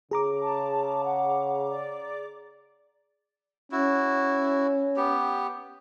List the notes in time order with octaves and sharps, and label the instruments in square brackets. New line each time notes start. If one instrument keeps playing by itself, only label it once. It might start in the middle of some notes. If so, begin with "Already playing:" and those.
[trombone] C#3 [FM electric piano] G#4 A#5 D6
[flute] A5
F#5
D5
[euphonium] C#4 [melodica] E4 F#4
[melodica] B3 G4